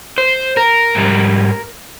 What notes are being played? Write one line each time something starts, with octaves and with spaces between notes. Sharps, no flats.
C5
A#4
G#2 G3